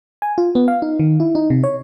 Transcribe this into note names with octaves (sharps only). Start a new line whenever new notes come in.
G#5
F4
B3
F5
D#4
D#3
E4
D#4
C3
C#5